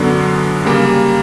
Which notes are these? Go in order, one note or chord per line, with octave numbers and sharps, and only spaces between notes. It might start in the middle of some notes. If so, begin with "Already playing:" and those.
Already playing: F#2 D3 F#3 B3 D4
C#3 G3 A#3